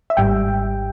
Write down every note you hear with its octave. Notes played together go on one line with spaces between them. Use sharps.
E5
G#1 G#2 G3 G5